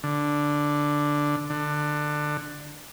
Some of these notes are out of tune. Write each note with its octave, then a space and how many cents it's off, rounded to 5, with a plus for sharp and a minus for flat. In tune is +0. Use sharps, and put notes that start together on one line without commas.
D3 +0
D3 +20